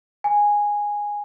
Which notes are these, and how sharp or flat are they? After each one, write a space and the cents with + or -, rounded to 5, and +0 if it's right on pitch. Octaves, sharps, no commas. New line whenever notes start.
G#5 -10